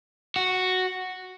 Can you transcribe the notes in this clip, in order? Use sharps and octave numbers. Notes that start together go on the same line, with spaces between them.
F#4